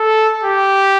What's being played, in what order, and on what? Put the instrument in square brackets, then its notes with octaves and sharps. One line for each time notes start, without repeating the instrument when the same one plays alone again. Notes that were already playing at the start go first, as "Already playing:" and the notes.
Already playing: [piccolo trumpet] A4
G4